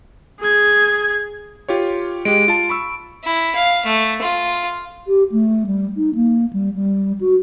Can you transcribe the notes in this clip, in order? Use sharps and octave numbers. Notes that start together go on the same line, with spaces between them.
G#4 G#6
F4 G4 C#5
G#3 G4 D7
F4 A5
B5 C#6 E6
E4
F5
A3
F4
G4
A3
G3
D#4
A#3
G3
G3
F#4